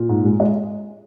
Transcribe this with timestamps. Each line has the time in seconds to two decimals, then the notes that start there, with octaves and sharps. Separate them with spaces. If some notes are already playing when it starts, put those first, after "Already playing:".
Already playing: A#2
0.09 G#2
0.25 G#3
0.40 G#3 D#5